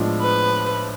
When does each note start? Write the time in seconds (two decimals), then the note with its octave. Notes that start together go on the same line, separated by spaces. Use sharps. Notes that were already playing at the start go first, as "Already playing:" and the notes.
Already playing: A2 F3 G#3 B3 D4
0.22 B4